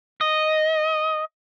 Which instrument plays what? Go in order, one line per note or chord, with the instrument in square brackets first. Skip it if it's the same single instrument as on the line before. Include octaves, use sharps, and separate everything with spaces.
[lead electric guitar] D#5